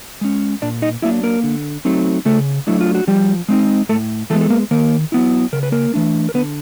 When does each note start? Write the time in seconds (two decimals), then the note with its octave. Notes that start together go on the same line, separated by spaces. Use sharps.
0.21 G#3 C#4
0.62 A#2 D4 D5
0.82 D#4 D#5
1.02 F#3 A#3 D4 E4 E5
1.23 A#3 A#4
1.43 D3
1.85 F#3 A3 C4 D#4
2.25 C#3 A3 A4
2.67 F#3 A3 D4 E4
2.81 F4
2.95 F#4
3.07 F3 G3 G4
3.48 G#3 C4 D#4
3.89 A2 A3 A4
4.30 E3 G#3 A3 B3 A4
4.41 A4
4.50 A#3 A#4
4.71 D#3 A#3 A#4
5.12 F#3 B3 E4
5.53 C#3 A#4
5.63 B4
5.72 A#3 A#4
5.94 E3 A3 D4
6.29 A#4
6.34 D3 B3 B4